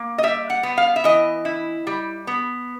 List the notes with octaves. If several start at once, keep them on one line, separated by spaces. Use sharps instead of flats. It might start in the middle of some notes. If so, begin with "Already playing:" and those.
Already playing: A#3
D#5
G3 E5
F#5
B3
F5
E5
E3 D#5
E4
G3
B3